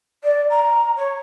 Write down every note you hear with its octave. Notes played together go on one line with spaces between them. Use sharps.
D5
A#5
C#5